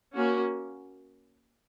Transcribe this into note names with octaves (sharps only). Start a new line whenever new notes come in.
A#3 C#4 F#4